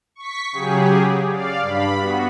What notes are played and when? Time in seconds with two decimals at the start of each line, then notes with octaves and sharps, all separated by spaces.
0.15 C#6 B6
0.52 C#3 F#3 G4 G#4
1.29 D5 F5
1.60 G2 B5
1.98 B3 F#4